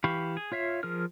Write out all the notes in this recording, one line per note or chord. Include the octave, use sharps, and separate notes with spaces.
E3 G4 F5 B5 C#6
G#4
F4 C#5 E5 F5
F3 G#4 A#4 F6